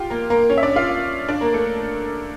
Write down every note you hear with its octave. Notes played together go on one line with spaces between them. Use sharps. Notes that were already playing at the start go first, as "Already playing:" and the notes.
Already playing: F4 G4
A#3 A#4
A#3 A#4
C#4 C#5
E5
D4 D5
F4 F5
D4 D5
A#3 A#4
A3 A4